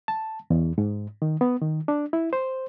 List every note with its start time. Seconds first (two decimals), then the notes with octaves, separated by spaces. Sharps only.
0.08 A5
0.50 E2
0.78 G#2
1.22 D#3
1.41 B3
1.62 D#3
1.88 D4
2.13 E4
2.33 C5